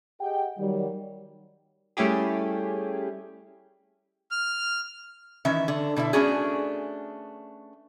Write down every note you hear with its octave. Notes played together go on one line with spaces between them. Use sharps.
G4 G#4 D#5 F#5 G5
D#3 F#3 G3
G3 A3 C#4 E4 G4 G#4
F6
D#3 E3 C#4 E5
D3
B2 D3 E4 E5
A3 B3 C#4 D4 F#4 G#4